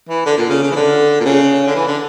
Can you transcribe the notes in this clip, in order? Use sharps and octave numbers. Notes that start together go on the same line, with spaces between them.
E3
D3
A#2
C#3
C#3
E3
D3
A#2
C#3
D3
E3
D3